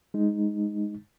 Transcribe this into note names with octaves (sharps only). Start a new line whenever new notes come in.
G#3 D#4